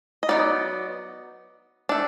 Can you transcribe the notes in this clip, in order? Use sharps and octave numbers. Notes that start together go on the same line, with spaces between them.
D#5
F#3 B3 D#4 D5
A3 D4